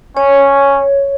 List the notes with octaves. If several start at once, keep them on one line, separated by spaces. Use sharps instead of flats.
C#4 C#5